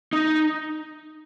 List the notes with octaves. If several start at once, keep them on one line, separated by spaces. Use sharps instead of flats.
D#4